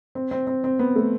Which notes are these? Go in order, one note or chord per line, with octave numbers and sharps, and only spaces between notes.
C4
C4
C4
C4
B3
A3